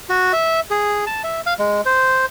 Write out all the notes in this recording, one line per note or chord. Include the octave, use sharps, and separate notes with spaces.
F#4
E5
G#4
A5
E5
F5
G#3
C5